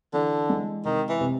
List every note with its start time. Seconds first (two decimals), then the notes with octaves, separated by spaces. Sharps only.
0.13 D3 E3
0.49 G#3
0.85 C3 D#3
1.09 E3
1.20 C3